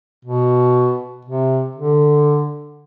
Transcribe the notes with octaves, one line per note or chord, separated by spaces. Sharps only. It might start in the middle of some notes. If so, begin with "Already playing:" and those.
B2
C3
D3